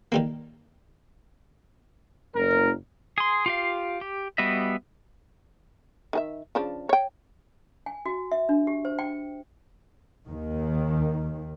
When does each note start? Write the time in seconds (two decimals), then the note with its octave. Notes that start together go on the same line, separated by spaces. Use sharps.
0.12 D#3 G3 A#3
2.36 F#1 A#4
3.18 G#4 C6
3.46 F4 G4 F5
4.01 G4
4.38 G3 B3 F#4 D#5 E5
6.13 D#3 G#4 E5
6.55 C#3 F3 D4
6.89 C#5 G5
7.86 G#5
8.06 F#4
8.32 E5
8.49 D4
8.67 G4
8.85 C5
8.99 G5
10.27 D#2 D#3